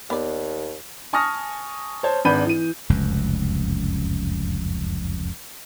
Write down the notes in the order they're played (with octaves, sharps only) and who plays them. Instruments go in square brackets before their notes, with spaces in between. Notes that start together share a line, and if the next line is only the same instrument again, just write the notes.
[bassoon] D#2 [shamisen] B3 D5
[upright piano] G#5 A5 C#6 D#6 F6 A#6
C5 C#5 A5
G#1 D4 B4 B5 G6 D#7
E3 D#7
[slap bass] F1 C#2 F#2